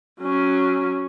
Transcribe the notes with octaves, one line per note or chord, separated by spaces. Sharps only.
F#3 C#4